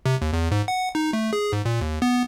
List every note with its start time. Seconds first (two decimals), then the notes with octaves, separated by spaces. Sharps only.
0.06 C3
0.22 D#2
0.33 E2
0.51 G#2
0.68 F#5
0.95 D#4
1.13 A3
1.33 G#4
1.53 G#2
1.65 A#2
1.81 D#2
2.02 B3